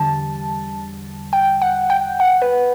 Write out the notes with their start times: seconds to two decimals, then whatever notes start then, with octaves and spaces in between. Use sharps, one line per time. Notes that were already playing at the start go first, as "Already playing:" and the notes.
Already playing: E2 D3 G3 A5
1.33 G5
1.62 F#5
1.90 G5
2.20 F#5
2.42 B4